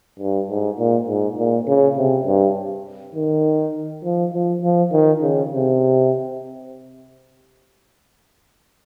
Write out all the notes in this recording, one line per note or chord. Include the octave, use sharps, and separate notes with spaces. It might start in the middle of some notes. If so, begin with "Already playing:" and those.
G2
G#2
A#2
G#2
A#2
C#3
C3
G2
D#3
F3
F3
F3
D#3
C#3
C3